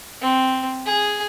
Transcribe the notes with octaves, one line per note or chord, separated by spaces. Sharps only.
C4
G#4